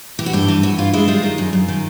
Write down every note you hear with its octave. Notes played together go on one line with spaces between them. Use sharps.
E3 G4
F#4
G2 G4
E3
E3 F#4
G2 F4
G#3 E4
G3 F4
D#3
F#2
F#2
D#3